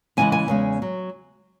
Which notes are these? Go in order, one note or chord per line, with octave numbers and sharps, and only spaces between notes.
F#2 C#3 E3 G#3 G#5
G#5
E2 C#3 G#3
F#3